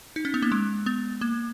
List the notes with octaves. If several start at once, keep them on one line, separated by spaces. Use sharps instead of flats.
D#4
C#4
B3
A#3
G#3
B3
A#3